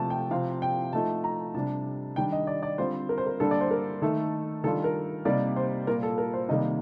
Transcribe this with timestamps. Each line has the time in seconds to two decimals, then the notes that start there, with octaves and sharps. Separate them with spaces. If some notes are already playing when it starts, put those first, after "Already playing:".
Already playing: C3 F3 A3 A5
0.10 G5
0.31 C3 F3 C4 F5
0.62 G5
0.93 F3 A3 D#4 A5
1.24 A#5
1.54 C3 G3 D4 A5
2.16 D#3 G3 D4 G5
2.32 D#5
2.47 D5
2.63 D5
2.78 D3 G3 C4 F4 C5
3.09 A#4
3.18 C5
3.26 A#4
3.40 D3 G3 A#3 D4 A4
3.51 D5
3.61 C5
3.71 A#4
4.02 D#3 A3 D#4 A4
4.64 D#3 G3 D4 F4 A4
4.84 A#4
5.25 C3 G3 A#3 D#4 D5
5.56 C5
5.87 A#2 G3 A#3 F4 A#4
6.03 A4
6.18 A#4
6.34 C5
6.49 C3 D#3 G3 A#3 D#5